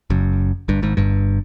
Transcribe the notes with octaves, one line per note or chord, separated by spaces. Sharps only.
F#1 F#2
G1 G2
G#1 G#2
G1 G2